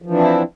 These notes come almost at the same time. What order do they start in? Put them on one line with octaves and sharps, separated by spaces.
F3 E3 D4 C4 E4